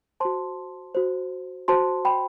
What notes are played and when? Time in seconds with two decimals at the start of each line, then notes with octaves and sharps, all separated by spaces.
0.20 F#4 C5 A5 C6
0.95 F#4 C5
1.68 F#4 C5 A5 C6
2.05 G5 B5